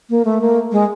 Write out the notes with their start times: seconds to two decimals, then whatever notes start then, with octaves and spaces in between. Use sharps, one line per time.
0.10 A#3
0.25 A3
0.41 A#3
0.72 G#3